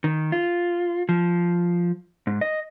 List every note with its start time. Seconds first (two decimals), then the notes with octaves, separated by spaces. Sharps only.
0.04 D#3
0.32 F4
1.09 F3
2.27 G#2
2.41 D#5